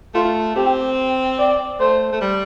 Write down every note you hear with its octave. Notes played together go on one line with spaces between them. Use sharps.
A3 F4
C4 G4
D5
A3 C5
A3
G3